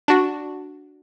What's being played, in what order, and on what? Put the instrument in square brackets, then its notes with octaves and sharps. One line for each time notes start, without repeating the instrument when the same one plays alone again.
[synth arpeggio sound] D4 F#4